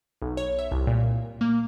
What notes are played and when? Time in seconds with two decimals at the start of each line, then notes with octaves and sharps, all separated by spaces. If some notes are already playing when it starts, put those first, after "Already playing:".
0.22 B1
0.37 C#5
0.59 E5
0.72 C2
0.87 A#2
1.41 A#3